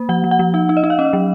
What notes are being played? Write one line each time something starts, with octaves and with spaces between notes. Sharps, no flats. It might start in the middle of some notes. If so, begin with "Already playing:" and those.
Already playing: A#3
F3 F#5
F3
F#5
F3
D#4 F#5
D#4
D#5
D#4
F5
C#4 D#5
F#3